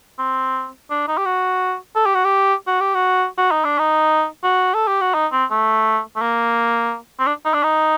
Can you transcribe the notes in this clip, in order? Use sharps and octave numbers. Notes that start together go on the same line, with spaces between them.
C4
D4
D#4
G4
F#4
A4
G4
F#4
G4
F#4
G4
F#4
F#4
D#4
D4
D#4
F#4
A4
G4
F#4
D#4
C4
A3
A3
A#3
C4
D4
D#4
D4
D#4